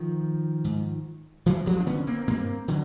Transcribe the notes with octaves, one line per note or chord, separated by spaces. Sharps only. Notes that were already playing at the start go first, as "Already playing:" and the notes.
Already playing: D#3 F3
G#2
G2 E3 F#3
F3 G3
D4
D3 B3 C#4
A#3 C4
G2 A#3 C4
D3 F#3